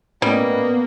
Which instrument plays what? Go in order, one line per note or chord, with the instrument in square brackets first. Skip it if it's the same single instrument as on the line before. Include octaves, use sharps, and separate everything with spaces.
[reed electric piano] A2 C#4 D#5 [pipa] G3 [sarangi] A#3 [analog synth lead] B3